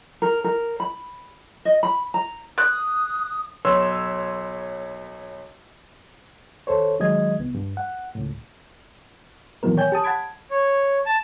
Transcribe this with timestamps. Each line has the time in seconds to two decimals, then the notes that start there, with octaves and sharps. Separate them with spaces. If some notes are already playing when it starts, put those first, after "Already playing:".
0.22 A#4
0.44 A#4
0.80 B5
1.65 D#5
1.83 B5
2.14 A#5
2.58 D#6 F#6
3.65 B1 B4 C#5 C6 E6
6.67 D#2 A4 C5 C#5
7.00 D#3 F#3 G#3 D#5 G#6
7.39 C2 B3
7.55 G2
7.77 F#5
8.15 C#2 A2
9.63 A#2 D#3 E3 F#3 B3 A#4
9.77 C#5 G5 G#5 G6
9.92 G4 A5 D#6
10.04 F#5 A5 B5 G#6 D7
10.51 C#5
11.06 A5